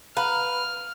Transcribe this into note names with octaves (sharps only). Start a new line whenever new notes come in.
B4 F5 F#5 A#5 F6